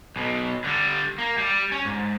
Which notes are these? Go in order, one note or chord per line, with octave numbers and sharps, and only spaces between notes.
B1 B2
D3 G3
A#3
G3
C#4
G#2